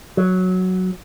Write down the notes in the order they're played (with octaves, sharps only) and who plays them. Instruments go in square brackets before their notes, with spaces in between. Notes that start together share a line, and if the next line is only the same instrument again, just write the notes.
[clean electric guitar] F#3